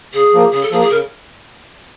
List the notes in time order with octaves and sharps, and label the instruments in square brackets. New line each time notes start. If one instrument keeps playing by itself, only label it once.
[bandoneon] C#3 [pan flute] G#4
[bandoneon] F3 A#3
[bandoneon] C#3 [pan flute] G#4
[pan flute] A4
[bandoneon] F3 A#3 [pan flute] G#4
[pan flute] G#4
[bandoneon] C#3 [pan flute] A#4